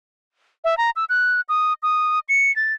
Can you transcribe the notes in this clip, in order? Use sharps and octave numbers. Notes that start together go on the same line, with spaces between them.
E5
A#5
E6
F#6
D#6
D#6
C#7
A6